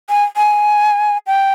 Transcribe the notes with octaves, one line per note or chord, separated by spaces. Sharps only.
G#5
G#5
G5